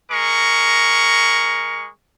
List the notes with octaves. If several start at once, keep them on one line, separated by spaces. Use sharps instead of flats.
G#3 A#4 C#6